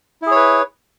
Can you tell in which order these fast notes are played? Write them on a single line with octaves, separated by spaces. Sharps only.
E4 G#4 C#5 B4